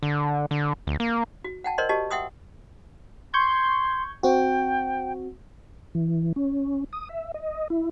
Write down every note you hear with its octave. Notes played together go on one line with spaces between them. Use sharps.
D3
D3
D2
A#3
F#4
F#5 G5 A5
A#4 C5 D5 D#5 C6
F#4 G4 D#5 A5
E5 F#5 G5 C6 D#6 E6
C6 C#6 G6 G#6
C4 F#4 G5
E3
C#4
D#6
E5
D#5
E4